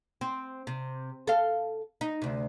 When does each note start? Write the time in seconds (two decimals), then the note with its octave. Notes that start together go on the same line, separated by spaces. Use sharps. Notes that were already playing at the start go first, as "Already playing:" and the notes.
0.21 C4
0.67 C3
1.27 A4 F5
2.01 D#4
2.22 D2 C3